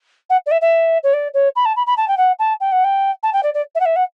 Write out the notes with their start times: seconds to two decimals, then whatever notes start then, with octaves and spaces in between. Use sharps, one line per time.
0.29 F#5
0.46 D5
0.51 E5
0.61 E5
1.03 C#5
1.13 D5
1.34 C#5
1.56 B5
1.65 A5
1.76 B5
1.87 B5
1.97 A5
2.08 G5
2.17 F#5
2.39 A5
2.60 G5
2.72 F#5
2.84 G5
3.23 A5
3.33 G5
3.43 D5
3.54 D5
3.75 E5
3.80 F#5
3.85 E5
3.96 F#5